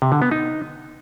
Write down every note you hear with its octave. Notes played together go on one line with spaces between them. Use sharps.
C3
D3
B3
D#4